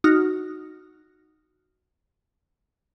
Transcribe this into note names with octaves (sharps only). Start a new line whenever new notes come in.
D#4 F#4 F6